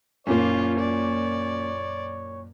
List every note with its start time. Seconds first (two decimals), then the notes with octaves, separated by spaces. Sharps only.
0.27 F#1 A#2 A#3 C#4 F4 C#5
0.79 D5